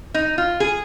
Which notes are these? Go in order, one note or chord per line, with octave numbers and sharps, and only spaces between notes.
D#4
F4
G#4